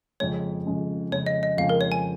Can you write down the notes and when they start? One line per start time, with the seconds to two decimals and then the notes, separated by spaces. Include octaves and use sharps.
0.20 F2 C#3 G#3 C#4 C#5
0.66 F2 C#3 G#3 C#4
1.11 F2 C#3 G#3 C#4 C#5
1.26 D#5
1.43 D#5
1.57 F2 C#3 G#3 C#4 F5
1.69 A#4
1.81 C#5
1.92 G#5